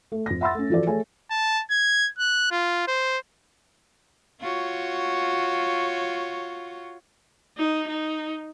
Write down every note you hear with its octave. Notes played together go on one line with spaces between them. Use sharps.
A3
F2 A#6
E5 F#5 B5 C6 E6 A6
A3 C#4
E3 F3 F#4 A4 D5
A3 G#4 C#5 G#5
A5
G#6
F#6
F4
C5
F4 F#4 C#5
D#4
D#4